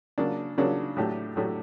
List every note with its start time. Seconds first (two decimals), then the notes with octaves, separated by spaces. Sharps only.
0.18 C#3 F#3 A#3 D4
0.58 C#3 F#3 A#3 D4
0.97 A2 F#3 A3 D4 G4
1.36 A2 F#3 A3 D4 G4